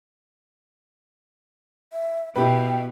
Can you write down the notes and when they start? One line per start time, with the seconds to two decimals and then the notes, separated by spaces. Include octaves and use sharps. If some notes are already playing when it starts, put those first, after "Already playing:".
1.93 E5
2.36 B2 E4 G4 B4 G5